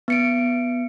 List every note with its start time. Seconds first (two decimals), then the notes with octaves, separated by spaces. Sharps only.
0.08 B3 C#7 D7